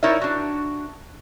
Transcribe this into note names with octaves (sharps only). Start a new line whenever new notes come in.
D#4 E4 A#4 C#5 D5 E5
D4 F#4